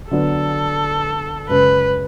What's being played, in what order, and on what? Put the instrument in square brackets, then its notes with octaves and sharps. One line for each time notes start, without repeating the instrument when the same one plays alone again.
[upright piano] D3 F#3 B3 D4 [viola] A4
[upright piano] F#2 C#3 G#3 C#4 [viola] B4